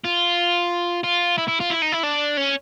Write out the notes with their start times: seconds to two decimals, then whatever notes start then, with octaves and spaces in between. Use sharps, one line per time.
0.04 F4
1.04 F4
1.38 E4
1.48 E4
1.60 F4
1.70 E4
1.82 D#4
1.92 E4
2.03 D4
2.37 C#4